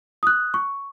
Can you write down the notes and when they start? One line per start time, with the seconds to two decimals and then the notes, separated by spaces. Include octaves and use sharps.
0.23 D#6 F#6
0.54 C#6